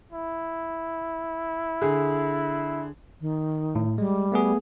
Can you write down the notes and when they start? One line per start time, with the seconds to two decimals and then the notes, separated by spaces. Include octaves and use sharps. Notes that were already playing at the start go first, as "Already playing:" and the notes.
0.13 E4
1.81 D3 G#4
3.21 D#3
3.75 A2
3.98 G3 G#3
4.32 A3 B3 G#4